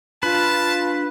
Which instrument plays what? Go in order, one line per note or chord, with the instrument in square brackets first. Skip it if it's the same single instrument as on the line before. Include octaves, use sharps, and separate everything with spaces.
[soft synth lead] D4 [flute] F4 [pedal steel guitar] B4 [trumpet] A5